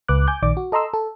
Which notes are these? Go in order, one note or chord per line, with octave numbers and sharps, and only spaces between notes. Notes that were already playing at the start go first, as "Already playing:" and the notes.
C#2 B4 D6 F#6
G#5 D6 G6
A#1 D#3 D5 D6
F#4
A4 D#5 A#5 C6 E6
A4